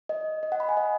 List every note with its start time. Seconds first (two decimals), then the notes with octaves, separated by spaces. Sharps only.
0.09 D#5
0.43 D#5
0.52 F#5
0.60 B5
0.69 G#5
0.77 D#5